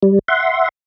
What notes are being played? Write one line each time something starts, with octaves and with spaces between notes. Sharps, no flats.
G3
E5 F#5 C6